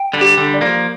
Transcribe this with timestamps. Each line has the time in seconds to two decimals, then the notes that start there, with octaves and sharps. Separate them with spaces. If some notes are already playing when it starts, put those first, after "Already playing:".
Already playing: G5
0.13 D3 G3
0.21 G4
0.37 D3 G3
0.54 D5
0.61 F3 A#3